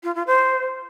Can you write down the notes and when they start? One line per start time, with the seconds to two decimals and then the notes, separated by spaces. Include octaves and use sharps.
0.04 F4
0.15 F4
0.27 C5